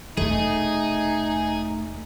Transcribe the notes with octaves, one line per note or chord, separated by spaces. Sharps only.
E1 C3 A3 D#4 G#4